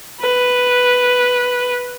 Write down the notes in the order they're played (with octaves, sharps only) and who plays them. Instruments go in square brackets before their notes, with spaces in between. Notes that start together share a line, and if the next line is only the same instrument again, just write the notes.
[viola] B4